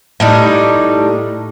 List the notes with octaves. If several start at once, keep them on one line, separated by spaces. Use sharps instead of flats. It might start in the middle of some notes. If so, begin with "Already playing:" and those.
A2 G3 D#4